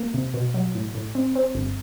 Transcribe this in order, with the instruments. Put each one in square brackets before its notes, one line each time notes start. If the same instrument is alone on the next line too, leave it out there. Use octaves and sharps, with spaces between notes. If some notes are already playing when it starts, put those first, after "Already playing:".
Already playing: [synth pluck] A#3
C3
B2
F#3
A2
A2
C4
C4
G1